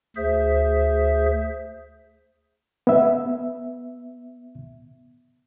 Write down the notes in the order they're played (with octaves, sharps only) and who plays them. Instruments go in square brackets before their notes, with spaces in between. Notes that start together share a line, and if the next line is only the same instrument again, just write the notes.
[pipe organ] D2 G#4 C5 E5
[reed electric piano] B3 E5